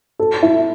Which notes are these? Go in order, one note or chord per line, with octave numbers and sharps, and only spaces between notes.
A4
E4